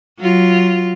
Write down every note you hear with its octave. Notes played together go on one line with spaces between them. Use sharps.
F#3 F4